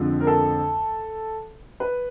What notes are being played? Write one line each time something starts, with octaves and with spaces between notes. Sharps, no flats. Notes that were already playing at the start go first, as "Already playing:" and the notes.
Already playing: F2 D3 F3 G#3
A#4
A4
B4